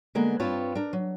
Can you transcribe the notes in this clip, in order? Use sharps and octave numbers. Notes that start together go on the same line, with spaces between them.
D3 G#3 A#3 B3
G2 C4 F4 B4 C#5 A5
D4 A#4
F#3